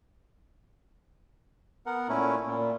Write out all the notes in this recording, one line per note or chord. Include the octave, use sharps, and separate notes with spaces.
B3 A#4 F#5
A#2 A3 C#4 E4
A#2